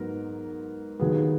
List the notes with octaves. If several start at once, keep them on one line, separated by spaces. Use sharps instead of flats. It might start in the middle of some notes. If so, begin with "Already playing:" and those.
Already playing: G#2 F#3 B3 A#4
D#2 D#3 F#3 B3 G#4